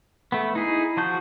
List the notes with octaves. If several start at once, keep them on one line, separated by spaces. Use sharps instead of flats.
A3 B3
D#4 E4 G#4
F3 F#4 A5 G6